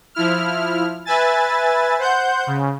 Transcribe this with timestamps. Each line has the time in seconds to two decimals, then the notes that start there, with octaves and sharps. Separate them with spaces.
0.15 F3 E4 F6
1.05 B4 E5 G#5 A6
1.99 C5 F#5 G6
2.47 C#3